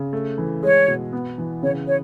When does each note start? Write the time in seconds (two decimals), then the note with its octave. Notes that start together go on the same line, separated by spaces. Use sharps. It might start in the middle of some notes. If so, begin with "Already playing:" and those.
Already playing: C#3
0.13 A3
0.38 E3
0.63 G#3 C#5
0.88 B2
1.13 B3
1.38 E3
1.63 C#3 C#5
1.88 C#5